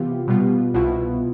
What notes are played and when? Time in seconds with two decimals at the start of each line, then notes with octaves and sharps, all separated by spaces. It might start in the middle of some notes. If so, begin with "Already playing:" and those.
Already playing: C3 E3 B3 F4 G4
0.27 B2 G3 B3 F4
0.74 C2 B2 B3 E4 F4